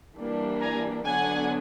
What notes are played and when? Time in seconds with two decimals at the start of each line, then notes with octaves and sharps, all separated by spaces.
0.16 E3 G3 A#3 D4
0.61 G#5 A#5
1.06 D3 F#3 B3 D4 F#5 G#5